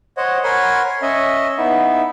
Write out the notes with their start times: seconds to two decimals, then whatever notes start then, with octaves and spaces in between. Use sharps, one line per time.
0.17 C5 C#5 D#5 F#5
0.44 A#4 C#5 F#5 G#5 B5 C6
1.02 C#4 D#5 E5
1.58 B3 D#4 E4 E5